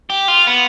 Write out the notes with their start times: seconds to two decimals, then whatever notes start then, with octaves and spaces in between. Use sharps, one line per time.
0.10 G4
0.28 F4
0.47 B3